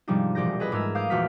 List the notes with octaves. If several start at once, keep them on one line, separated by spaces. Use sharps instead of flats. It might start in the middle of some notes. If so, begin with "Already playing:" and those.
G#2 C3 F3 G3 D4 D#4
E1 A#1 G4 D5 G6 A#6
G#4 A4 B4 D#5 G#5
G#2 A3 A#4 E6 G#6
F5 D6 D#6 F6 G6
A#1 E2 A3 F#4 F6 B6